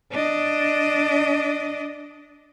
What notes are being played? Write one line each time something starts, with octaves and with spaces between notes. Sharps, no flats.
D4 D#5